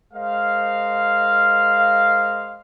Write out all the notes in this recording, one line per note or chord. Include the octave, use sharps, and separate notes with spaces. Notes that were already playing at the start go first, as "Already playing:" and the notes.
G#3 A#4 C5 D#5 F5